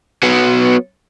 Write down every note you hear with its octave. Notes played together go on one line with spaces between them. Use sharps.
F#3 B3